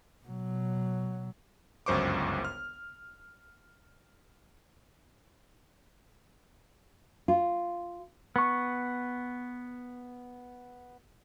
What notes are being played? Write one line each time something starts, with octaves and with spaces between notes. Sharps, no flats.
B2 F#3
G1 C#2 F#2 C5 C#6 D6
F6
F4
B3 C#6